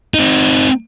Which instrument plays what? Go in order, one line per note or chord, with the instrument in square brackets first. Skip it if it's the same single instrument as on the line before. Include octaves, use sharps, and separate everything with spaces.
[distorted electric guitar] C4 D#4